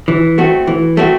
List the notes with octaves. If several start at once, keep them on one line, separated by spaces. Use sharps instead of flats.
E3
A3 C4 F#4
E3
A3 C4 F#4